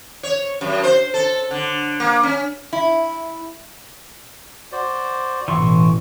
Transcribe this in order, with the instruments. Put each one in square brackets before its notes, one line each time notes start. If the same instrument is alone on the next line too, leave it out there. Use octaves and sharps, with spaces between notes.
[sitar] C#5
F#2
C5
A4
D3
A#3
C#4
[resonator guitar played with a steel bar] E4
[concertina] F#4 C5 D5
[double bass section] A1 B2 [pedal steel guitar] E3 C6 C#6 [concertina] F#4